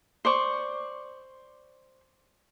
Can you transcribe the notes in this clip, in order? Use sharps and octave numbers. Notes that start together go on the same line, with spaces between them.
C5 D5 C#6